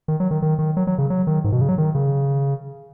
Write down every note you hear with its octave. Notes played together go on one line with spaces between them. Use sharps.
D#3
F#3
D#3
D#3
D#3
F#3
F#3
C#3
F#3
D#3
G#2
B2
C#3
F#3
D#3
C#3